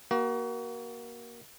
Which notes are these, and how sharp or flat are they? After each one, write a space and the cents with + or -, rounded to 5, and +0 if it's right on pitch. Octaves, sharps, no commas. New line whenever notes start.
A#3 +20 F#4 +35